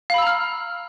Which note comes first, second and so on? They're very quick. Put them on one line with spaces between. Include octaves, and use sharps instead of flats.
F5 B5 E6 A#5 F6